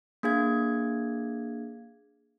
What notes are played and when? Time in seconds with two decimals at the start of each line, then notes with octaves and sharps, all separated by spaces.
0.23 A#3 D4 G#4 F5 G#6